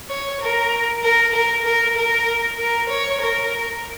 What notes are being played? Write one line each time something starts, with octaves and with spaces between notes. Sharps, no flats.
C#5
A#4
A#4
A#4
A#4
A#4
A#4
C#5
A#4